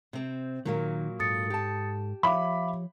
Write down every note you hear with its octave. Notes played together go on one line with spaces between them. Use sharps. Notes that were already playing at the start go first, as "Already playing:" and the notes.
C3 C4
A#2 D#3 F#3 A#3
G#2 A4 D#6 A6 C#7
G4 A5
F3 C#5 E5 F5 B5 D6